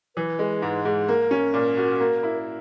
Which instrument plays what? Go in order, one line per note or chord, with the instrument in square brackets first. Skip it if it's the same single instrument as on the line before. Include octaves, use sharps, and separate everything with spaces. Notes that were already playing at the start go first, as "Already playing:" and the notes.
[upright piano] E3 [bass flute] B4
[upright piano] G#3
G#2
G#2
[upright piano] A#3 [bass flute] A#4
[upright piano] C#4
A#2
F#4
A#3
E4